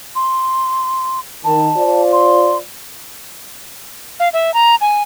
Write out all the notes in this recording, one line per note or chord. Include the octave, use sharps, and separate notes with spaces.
C6
D#3 A5
F4 C5 D5
C6
F5
E5
A#5
G#5